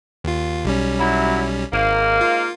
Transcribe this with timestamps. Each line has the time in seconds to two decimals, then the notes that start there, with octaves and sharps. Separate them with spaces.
0.24 D#2 F4
0.65 B1 G3 C#4
0.99 F#3 E4
1.72 G#1 G#2 A#3
2.21 F4